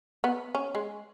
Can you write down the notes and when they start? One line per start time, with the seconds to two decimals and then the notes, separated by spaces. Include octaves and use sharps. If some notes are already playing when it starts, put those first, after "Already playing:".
0.24 B3
0.55 C#4
0.75 G#3